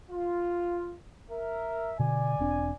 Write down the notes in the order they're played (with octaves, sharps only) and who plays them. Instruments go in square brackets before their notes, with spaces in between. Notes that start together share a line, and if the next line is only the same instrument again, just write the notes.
[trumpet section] F4
A#4 E5
[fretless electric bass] B2 D3 [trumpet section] D5 G#5
[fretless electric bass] E1 C4 D4